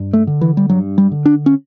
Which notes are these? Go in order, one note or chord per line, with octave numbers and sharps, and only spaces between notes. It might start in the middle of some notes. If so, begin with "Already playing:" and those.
Already playing: G2
A3
D3
E3
G3
G2 F#3
G3
D3
D4
C#4